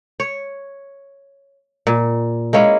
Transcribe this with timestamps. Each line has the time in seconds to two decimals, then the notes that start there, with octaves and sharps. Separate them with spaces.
0.20 C#5
1.87 A#2
2.53 G#3 A#3 C#4 E4